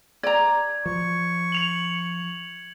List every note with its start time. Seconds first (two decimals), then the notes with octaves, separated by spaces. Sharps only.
0.23 D5 A#5 G#6
0.86 F3 C#6
1.52 C#7 F7 F#7